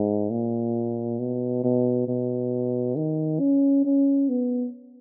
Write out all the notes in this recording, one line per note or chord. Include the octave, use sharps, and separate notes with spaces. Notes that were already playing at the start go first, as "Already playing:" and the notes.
Already playing: G#2
A#2
B2
B2
B2
D#3
C#4
C#4
B3